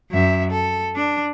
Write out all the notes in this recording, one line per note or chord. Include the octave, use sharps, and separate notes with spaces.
F#2 E5
A4
D4